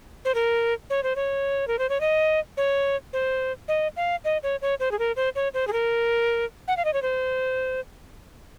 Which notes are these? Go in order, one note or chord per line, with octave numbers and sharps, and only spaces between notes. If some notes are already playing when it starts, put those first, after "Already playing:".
C5
A#4
C#5
C5
C#5
A#4
C5
C#5
D#5
C#5
C5
D#5
F5
D#5
C#5
C#5
C5
G#4
A#4
C5
C#5
C5
G#4
A#4
F#5
F5
D#5
C#5
C5